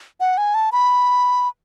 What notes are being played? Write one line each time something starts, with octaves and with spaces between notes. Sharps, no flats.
F#5
G#5
A5
B5